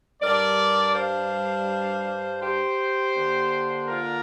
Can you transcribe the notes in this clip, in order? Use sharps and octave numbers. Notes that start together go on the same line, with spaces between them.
G2 G3 D4 A#4 D5
C5 F5
G4 C5
D3 A#3 D4
F4 A#4